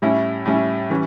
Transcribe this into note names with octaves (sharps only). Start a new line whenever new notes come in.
A2 G3 C#4 E4
A2 G3 C#4 E4
E3 G3 C#4